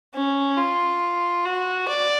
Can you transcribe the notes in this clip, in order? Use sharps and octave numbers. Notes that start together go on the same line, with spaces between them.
C#4
F4
F#4
D5